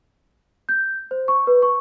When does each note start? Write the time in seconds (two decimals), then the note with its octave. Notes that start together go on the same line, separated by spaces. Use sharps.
0.69 G6
1.11 C5
1.28 C#6
1.47 B4
1.62 C#6